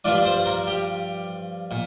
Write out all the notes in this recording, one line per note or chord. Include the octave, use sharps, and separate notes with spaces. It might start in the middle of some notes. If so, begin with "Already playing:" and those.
G2 F3 D4 F4 D5
C5
A#4
G4
A#2